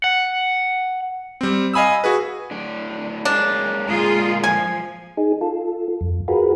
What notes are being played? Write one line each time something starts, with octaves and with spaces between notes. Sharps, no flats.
F#5
G3 C4
D#5 F5 G#5 B5 D#6 E6
F#4 G#4 B4
A2 D4
G#3 A#3 C#4 D4
A#2 D3 G#3 F4 G#4 A#4
F3 G#5
D#4 G#4
F4 A4
F2
F4 F#4 G#4 A#4 B4